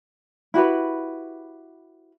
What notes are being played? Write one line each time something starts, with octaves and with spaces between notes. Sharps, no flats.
E4 F#4 G4 B4